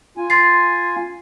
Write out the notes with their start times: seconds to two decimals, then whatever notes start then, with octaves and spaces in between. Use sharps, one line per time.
0.17 F4 G#5
0.30 C6 A6 C7